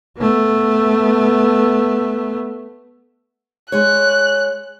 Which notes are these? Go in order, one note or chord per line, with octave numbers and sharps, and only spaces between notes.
A3 B3
G#3 C#5 F#6